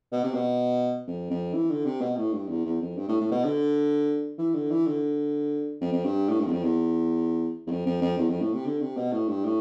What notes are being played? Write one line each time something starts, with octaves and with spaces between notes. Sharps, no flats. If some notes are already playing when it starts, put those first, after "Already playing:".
B2
C3
B2
F2
F2
E3
D3
C3
B2
A2
G2
E2
E2
F2
G2
A2
A2
B2
D3
E3
D3
E3
D3
F2
F2
G2
A2
G2
E2
F2
E2
E2
F2
F2
F2
E2
F2
A2
C3
D3
C3
B2
A2
G2
A2